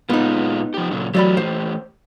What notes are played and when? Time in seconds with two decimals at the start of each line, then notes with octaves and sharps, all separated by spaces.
0.10 A#2 G#3 B3 D#4 F4
0.74 F3 G4
0.91 A#2 C#3 F#3
1.15 E3 F#3 A3 G4 D5 B5
1.37 C5